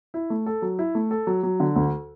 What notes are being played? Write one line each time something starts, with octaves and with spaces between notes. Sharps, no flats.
E4
A3
A4
F#3
E4
A3
A4
F#3
F#3
D3
D2